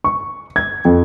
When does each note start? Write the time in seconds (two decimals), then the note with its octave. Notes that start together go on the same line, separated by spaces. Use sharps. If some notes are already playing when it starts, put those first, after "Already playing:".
0.04 C#6
0.56 G#6
0.85 F2